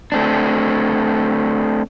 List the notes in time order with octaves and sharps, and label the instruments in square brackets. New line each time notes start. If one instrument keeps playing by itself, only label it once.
[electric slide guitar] A3 C4 D4